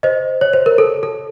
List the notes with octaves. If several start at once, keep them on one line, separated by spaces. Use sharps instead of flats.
C5 D#5
C#5
C5
A#4
A4
A4